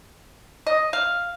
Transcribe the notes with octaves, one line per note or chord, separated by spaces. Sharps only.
D#5
F5